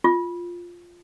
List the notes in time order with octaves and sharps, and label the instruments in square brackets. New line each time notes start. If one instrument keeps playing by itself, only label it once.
[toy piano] F4